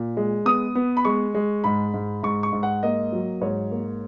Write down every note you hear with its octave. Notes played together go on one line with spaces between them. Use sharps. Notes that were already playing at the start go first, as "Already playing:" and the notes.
Already playing: A#2
G#3
B3 D#6
B3
B5
G#3 C#6
G#3
G#2 B5
G#2
G#2 C#6
C#6
G#2
F#5
A#3 D#5
F#3
G#2 C#5
A#3